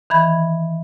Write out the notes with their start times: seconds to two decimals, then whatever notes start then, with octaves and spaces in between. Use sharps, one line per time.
0.10 D#3 E3 B5 G#6